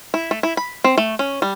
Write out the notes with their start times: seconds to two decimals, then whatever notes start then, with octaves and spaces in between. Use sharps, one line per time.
0.14 E4
0.31 A3
0.43 E4
0.57 B5
0.84 C4
0.98 A3
1.19 C#4
1.42 G3